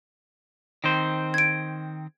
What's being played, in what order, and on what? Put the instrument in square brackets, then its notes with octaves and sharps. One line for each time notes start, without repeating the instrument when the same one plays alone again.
[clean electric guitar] D#3 C4 C5
[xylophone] G#6 D7